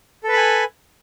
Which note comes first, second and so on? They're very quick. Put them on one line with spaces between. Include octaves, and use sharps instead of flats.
A4 B4 B5 G#5